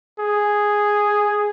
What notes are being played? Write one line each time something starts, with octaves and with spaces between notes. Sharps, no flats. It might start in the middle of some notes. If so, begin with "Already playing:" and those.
G#4